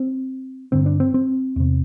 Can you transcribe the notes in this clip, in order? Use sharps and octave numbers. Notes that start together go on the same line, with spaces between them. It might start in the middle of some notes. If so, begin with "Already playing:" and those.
Already playing: C4
G2 D3 C4
D4
C4
C4
E2 C3